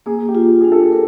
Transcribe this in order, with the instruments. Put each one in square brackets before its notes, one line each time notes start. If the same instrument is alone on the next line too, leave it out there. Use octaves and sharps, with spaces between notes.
[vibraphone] A#3 [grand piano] G#4
[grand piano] G4
[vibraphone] F4
[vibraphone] D4 [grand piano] G#4
[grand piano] A4
[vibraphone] A#4